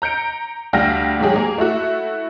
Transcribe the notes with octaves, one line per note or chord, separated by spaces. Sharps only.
A#5 G6 C#7 D7
D2 G3 F5 G5 F6 A#6
G#2 D#3 F#3 G4 G#4
A#3 G#4
A3 E4 F#4